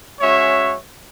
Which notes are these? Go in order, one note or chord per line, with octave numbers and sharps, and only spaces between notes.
G#3 C#4 F#4 C#5 E5